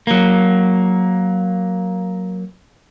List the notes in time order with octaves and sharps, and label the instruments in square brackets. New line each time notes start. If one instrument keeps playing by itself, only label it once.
[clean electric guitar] F#3 A#3